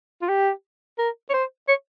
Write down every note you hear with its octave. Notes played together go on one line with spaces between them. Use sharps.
F4
G4
A#4
C#5
C5
C#5